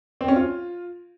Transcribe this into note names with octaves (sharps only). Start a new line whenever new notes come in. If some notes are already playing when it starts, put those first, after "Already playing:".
C4
C#4
F4